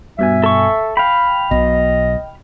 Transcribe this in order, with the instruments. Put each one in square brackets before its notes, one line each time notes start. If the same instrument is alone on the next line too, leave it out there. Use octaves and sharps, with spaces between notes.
[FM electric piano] G2 B2 G#5 [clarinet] E5
[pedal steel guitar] A4 C#6
[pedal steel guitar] F5 B5 [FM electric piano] G5
[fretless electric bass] B1 B2 [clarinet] D#5